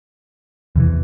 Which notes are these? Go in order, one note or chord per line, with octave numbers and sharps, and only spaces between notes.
E2 C3 E3